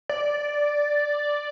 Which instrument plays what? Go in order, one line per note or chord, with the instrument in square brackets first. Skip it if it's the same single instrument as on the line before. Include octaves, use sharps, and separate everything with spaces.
[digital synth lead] D5